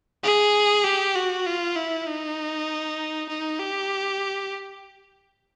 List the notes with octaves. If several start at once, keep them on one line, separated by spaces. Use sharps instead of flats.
G#4
G4
F#4
F4
E4
D#4
D#4
G4